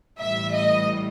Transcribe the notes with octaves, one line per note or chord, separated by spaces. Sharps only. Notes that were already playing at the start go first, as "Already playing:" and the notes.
A1 A2 G3 E5
D#5